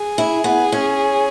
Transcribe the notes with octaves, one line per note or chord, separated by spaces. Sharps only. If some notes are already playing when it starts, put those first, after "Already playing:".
Already playing: G#4
E4
B3
C#4